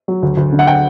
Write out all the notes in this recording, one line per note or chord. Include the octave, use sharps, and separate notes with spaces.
F#3
D2
D2
D3
F#5
G5